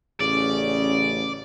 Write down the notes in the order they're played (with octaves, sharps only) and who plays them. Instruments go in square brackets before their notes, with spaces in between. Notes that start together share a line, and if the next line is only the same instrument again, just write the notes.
[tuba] A1 [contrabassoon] C#3 [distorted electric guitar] D5